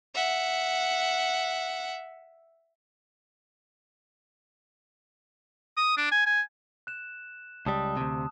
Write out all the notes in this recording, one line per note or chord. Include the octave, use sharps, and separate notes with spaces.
E5 F#5
D#6
D4
G#5
G#5
F#6 E7
C#2 G3 A5 D#6 E6
D2 C3